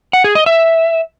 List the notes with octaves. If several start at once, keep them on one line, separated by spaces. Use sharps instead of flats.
F#5
G#4
D#5
E5